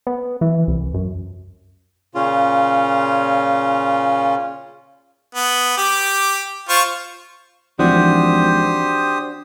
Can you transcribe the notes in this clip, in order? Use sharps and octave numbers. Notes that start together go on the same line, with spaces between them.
B3
E3
C2
F#2
A#2 C#3 C#4 F4
B3
G4 D6
F4 C5 C#6
G#1 E3 F3 D4 F#4 G4 C5 D#6